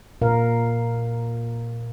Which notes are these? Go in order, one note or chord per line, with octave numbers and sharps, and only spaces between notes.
A#2 A#4 F5